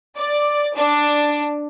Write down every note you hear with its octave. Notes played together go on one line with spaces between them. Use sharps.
D5
D4